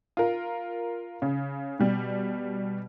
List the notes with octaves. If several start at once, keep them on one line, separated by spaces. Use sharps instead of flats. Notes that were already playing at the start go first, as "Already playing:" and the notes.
F4 A#4
C#3
B2 G3